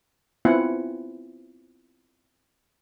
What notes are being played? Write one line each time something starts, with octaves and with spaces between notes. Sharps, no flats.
B3 C4 E4 F4 F#5 G#5